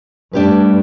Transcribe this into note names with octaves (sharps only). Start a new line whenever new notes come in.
G2 A3 D4 G4 B4